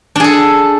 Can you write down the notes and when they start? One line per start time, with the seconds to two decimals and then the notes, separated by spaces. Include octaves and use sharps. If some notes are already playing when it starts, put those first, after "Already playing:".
0.16 D4
0.20 G#4
0.24 A4